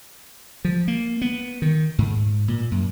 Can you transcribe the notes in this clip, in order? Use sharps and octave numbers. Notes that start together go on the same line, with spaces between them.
F3
A#3
B3
D#3
G#2
A#2
F#2